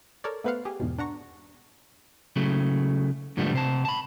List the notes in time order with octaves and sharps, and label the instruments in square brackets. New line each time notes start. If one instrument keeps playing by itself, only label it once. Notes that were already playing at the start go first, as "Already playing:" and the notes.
[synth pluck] A4 A#4 C#5 D5
A3 B3 B4 C5 F5 F#5
G4 G#4
E2 G#2 B2
D4 F#5 A#5 C#6
[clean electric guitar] C#3 F#3 A3
G#2 D3 F3 G3 A3 B3
C3 C5 A5
A5 B5